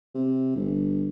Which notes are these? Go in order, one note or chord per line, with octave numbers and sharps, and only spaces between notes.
C3
G1